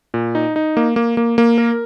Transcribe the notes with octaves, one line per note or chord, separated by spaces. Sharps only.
A#2
D#4
D#4
A#3
A#3
A#3
A#3
A#4